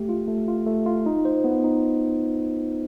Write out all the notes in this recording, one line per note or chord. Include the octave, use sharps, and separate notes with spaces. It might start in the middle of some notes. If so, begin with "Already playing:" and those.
Already playing: A3 G4
F4
A3
F4
A3
F4
D#4
C5
B3
D#4